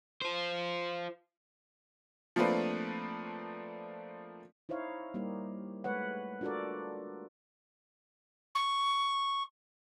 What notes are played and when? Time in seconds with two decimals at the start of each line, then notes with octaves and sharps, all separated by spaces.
0.22 F4 C5
2.36 F3 A3 A#3 C4 D4 B4
4.69 D#4 E4 C5 C#5 F5
5.14 G3 A#3 D#4 G4
5.84 G#3 A3 B4 C#5 F#5
6.41 D4 F4 F#4 A4 A#4 D5
8.55 C#6